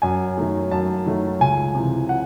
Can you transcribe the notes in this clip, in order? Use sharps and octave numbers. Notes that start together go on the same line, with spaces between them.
F#2 G#5
D#3 F#3 A3
F#2 A5
D#3 F#3 A3
C#2 G#5
C3 E3
F#5